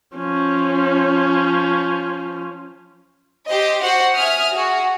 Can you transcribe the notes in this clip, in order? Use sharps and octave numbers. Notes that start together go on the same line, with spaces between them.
F3 C#4
G4 C5 D#5
F#4 C5 F#5
E5 G#5 D#6 F6
F#4 G#4